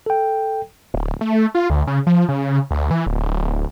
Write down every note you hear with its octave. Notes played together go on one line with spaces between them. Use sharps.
A4 G5
D1
A3
F4
D2
C#3
F3
C#3
D2
E3
D1